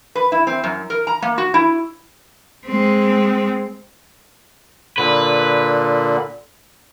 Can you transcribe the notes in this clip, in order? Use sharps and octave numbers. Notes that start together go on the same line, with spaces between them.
B4
E4
C4
F#2
A#4
A#5
A#3
F#4
E4
G#3 C4
A#2 D3 B4